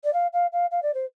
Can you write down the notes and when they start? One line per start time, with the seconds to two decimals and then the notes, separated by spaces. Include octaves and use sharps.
0.04 D5
0.13 F5
0.33 F5
0.53 F5
0.71 F5
0.83 D5
0.94 C5